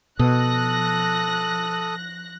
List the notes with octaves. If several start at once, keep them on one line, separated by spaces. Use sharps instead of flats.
B2 F3 A4 D#6 F#6 A#6